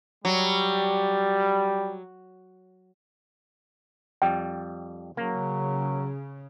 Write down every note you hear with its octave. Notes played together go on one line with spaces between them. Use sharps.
F#3 G3
F2 G3 G5
C#3 F#3 A#3